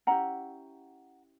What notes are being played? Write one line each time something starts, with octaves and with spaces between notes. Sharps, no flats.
C#4 E4 G4 F#5 A#5